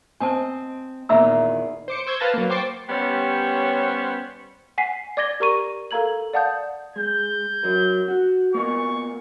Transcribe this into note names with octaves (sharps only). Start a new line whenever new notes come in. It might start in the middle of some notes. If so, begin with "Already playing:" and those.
C4 D#5 G#5 A5
E2 A#2 D#3 E5 A#5 E6
C5 D6 C#7
C5 C#6 E6 G6 G#6
B4 F5 A5 A6 A#6
F#3 A#3
C5 G5 C#6 D6 A6 C7
G3 B3 C#4 G4 C5 C#5
F#5 G#5 B6 C7
D5 D6 G#6 A#6 G7
G4 A#4 A#5 C#6 D#7
A4 A#4 F5 A#5 G#6 F#7
D5 F5 F#5 A5 D#6 G6
G#3 G6
F#3 A#4
F#4
A#3 B3 F4 C#6